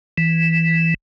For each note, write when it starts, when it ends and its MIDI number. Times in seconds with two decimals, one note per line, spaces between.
0.18 0.94 52